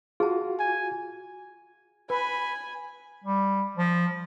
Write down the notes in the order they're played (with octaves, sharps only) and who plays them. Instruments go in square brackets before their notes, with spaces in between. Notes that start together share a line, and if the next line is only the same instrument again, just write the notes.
[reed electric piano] F4 F#4 [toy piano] G#4 A5
[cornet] G#5
[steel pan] B4 [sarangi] G#5 [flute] B5
[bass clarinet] G3
F3